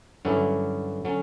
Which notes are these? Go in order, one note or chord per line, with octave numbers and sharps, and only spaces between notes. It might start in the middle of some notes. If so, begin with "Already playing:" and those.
G2 D3 F#3 C#4 E4
D3 F#3 C#4